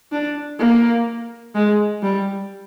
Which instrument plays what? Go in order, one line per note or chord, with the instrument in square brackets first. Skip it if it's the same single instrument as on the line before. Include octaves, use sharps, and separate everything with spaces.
[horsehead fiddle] D4
A#3
G#3
G3